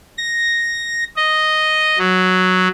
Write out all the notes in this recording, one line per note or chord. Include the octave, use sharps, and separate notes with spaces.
A#6
D#5
F#3